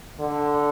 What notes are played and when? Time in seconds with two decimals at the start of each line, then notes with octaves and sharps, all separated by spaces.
0.21 D3